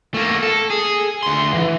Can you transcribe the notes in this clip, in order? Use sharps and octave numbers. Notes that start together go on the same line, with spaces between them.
A3 A#3
A4
G#4
D2 C6
E3